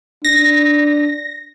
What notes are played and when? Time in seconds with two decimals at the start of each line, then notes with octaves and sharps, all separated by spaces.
0.25 D4 A#6